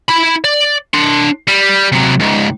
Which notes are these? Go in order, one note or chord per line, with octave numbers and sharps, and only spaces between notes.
E4 B5
D5
D4 C6
G3
C3 F#3
C#2 G#2